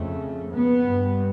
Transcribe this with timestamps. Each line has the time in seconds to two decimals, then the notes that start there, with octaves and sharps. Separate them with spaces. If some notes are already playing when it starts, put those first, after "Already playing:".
Already playing: F2 C#3 A3
0.54 B3
0.85 G2